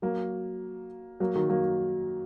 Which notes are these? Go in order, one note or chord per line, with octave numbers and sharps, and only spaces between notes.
F#3 A#3
F#3 A#3
D#3 F#3
F#3 A#3